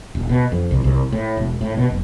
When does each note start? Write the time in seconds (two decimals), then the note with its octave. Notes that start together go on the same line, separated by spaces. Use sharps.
0.15 D#1
0.29 B2
0.52 F2
0.71 C2
0.84 C2
1.12 A2
1.37 E1
1.61 A2
1.77 B2
1.90 F#1